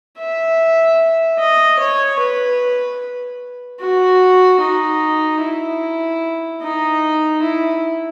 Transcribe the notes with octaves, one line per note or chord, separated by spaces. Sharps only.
E5
D#5
C#5
B4
F#4
D#4
E4
D#4
E4